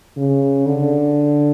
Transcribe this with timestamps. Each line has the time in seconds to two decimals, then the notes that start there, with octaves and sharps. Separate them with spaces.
0.17 C#3
0.66 D3